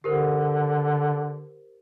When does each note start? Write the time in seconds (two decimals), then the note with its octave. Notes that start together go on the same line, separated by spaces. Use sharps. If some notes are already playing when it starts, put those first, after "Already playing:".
0.04 D3 G4 A#4 C5